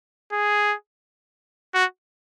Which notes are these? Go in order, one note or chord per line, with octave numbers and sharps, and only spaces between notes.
G#4
F#4